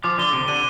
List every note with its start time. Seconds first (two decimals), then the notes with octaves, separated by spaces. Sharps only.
0.04 F3 D6
0.18 D3 G7
0.33 C3 D6
0.48 D3 D#7